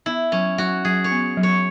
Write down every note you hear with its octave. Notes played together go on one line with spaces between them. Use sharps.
B3 E4
F#3 C#4
F#3 F#4
F#3 G#4
C#5
B3
F#3
C#5